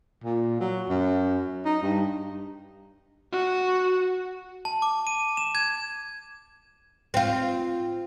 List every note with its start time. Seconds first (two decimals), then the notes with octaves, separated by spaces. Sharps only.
0.24 A#2
0.60 F#3
0.89 F#2
1.66 D#4
1.83 G2
3.32 F#4
4.65 A5
4.82 D6
5.07 D#7
5.37 E7
5.55 G#6
7.14 C4 F4